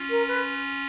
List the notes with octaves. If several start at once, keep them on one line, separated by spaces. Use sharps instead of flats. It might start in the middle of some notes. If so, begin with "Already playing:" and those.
Already playing: C#4 F4
A#4
B4